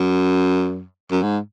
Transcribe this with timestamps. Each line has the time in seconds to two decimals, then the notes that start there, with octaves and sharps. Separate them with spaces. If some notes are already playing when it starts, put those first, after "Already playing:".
Already playing: F#2
1.11 F#2
1.23 G#2